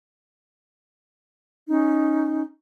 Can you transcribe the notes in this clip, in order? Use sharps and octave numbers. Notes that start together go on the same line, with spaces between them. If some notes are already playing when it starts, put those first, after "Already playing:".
C#4 D#4